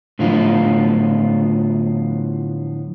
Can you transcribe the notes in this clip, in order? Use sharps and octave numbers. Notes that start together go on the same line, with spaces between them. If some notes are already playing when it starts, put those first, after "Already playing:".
A2 D3 F3 F#3 B3 F4